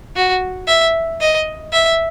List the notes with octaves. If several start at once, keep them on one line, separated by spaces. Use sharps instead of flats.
F#4
E5
D#5
E5